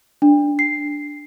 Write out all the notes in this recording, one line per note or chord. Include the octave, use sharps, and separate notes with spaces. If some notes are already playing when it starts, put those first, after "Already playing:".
D4
C7